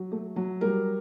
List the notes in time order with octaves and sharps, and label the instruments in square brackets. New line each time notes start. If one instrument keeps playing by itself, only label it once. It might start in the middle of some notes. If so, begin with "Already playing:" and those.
Already playing: [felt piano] F#3
A3
F#3
G3 A#4